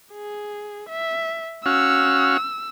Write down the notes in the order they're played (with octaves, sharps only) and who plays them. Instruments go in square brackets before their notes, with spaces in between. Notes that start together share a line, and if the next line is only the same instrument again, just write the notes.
[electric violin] G#4
E5
[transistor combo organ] C#4 F#4 F5 [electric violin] E6